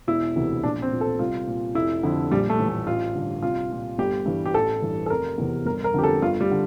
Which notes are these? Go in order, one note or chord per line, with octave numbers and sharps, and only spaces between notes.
E1 E4
D2 C3 E3
A#1 D4
C4
A#2
A4
C2 F4
A#2
F1 E4
F2 D3
A#1 G3
A3
A2 E3
A3
A1 F4
G2 D3
C2 F4
A#2
G1 G4
G2 E3
G4
A1 A4
G2 E3
A4
F1 A#4
E2 C3 E3
G1 A#4
A#4
F2 D3 G4
A4
G1 F4
G3
D3